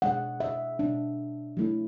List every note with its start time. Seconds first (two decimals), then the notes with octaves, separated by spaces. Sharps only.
0.02 B2 G#3 D4 F#5
0.40 E5
0.79 B2 G#3 D4
1.57 F#3 A3 E4